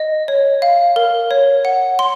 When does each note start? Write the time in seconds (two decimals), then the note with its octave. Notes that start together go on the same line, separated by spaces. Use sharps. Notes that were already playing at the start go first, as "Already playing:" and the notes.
Already playing: D#5
0.28 C#5
0.62 F5
0.96 A#4
1.31 C#5
1.65 F#5
1.99 C6